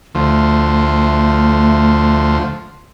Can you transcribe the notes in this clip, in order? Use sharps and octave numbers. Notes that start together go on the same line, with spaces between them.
D2 F3 A3